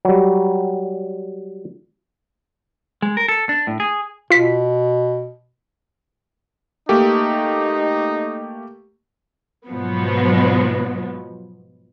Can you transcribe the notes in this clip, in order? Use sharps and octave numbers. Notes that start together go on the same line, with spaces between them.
F#3 G3
G#3
A#4
A4
D4
A2
G#4
B2 F4 B6
A3 A#3 D#4 G4
G#2 B2 F3 F#3 B3